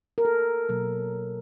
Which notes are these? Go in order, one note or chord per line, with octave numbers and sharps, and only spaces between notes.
A#4
A4
B2 F#3 A#3